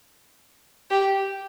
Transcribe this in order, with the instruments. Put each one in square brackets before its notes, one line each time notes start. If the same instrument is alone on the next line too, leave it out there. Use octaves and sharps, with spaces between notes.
[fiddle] G4